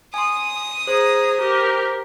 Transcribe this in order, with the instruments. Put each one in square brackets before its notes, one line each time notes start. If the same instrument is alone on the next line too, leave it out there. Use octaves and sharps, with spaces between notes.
[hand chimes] G#5 C6 [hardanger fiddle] D#6
[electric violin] G#4 A#5 [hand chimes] C5
[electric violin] G4 A#4